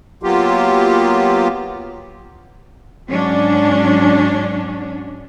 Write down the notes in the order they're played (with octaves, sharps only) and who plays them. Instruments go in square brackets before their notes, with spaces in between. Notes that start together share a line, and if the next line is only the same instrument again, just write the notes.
[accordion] F#3 A#3 B3 F4 G4
[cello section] G#2 F#3 C#4 D4